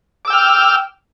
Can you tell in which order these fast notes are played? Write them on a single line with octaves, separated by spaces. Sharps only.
D6 E6 G5 F6